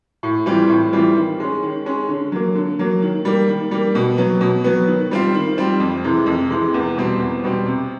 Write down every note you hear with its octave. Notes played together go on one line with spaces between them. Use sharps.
A2
E3 G3 C4 F4
A2
E3 G3 C4 F4
D#3
G#3 C#4
D#3
G#3 C#4
D3
F#3 A#3
D3
F#3 A#3
D#3
G3 A#3
D#3
G3 A#3
B2
F#3 B3
B2
F#3 B3
D#3
G3 C4 F4
D#3
G3 C4 F4
F2
C3 E3 G#3
F2
C3 E3 G#3
E2
B2 G3 C4
E2
B2 G3 C4
C3